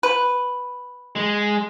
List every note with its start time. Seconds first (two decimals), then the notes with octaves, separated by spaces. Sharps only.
0.03 B4
1.16 G#3